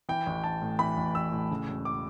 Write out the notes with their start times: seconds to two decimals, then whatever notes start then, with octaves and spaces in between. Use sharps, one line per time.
0.09 E3 G5
0.27 A1
0.44 A1 A5
0.62 A2
0.79 E3 B5
0.97 A1
1.15 A1 E6
1.32 A2
1.51 C#3
1.68 E1
1.85 D6